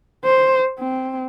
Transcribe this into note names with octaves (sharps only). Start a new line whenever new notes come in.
C5
C4